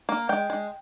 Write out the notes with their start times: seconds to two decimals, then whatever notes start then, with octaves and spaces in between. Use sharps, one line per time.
0.09 A#3
0.29 G#3 G5
0.50 G#3